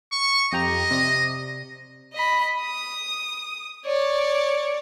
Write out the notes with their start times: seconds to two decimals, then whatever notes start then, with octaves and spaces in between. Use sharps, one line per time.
0.12 C#6
0.52 F2 G4 D#5 A#5
0.91 C3 D5 A#6
2.13 D#5 B5
2.61 D#6
3.85 C#5 D5